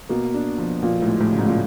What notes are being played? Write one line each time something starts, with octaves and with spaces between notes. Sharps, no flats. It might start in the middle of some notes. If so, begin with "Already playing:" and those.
B2 A#3
D4
F3
A#2 F3
A2
G#3
A2
C#3
G#2
A#2